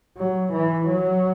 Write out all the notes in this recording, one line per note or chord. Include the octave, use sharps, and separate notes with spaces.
F#3
E3
F#3